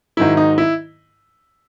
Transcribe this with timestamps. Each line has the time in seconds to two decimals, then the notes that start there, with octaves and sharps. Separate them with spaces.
0.17 G#2 D#3 F#3 E4
0.37 D#4
0.58 E4